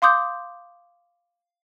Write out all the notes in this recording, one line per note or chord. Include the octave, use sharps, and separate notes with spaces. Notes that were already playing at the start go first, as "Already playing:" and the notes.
F5 C6 D6 D#6 G6